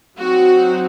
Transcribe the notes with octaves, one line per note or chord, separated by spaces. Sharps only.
F#3 C4 D#4 F#4